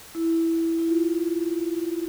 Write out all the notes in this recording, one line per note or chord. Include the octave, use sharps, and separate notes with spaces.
E4
E4
F4